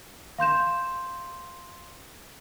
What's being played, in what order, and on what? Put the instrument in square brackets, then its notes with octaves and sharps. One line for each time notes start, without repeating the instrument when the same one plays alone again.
[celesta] F5 C6 G6 E7